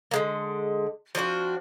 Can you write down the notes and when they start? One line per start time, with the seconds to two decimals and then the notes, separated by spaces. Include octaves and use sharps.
0.11 D3 G#3 A#3
1.15 F3 C4 D4 F#4